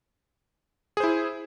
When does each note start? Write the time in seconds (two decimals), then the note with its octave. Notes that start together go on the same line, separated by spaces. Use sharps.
0.97 G#4
1.00 C5
1.04 E4